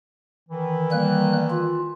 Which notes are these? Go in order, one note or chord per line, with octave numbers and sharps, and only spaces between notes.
D#3 E3
G3 A#3 F#6
F4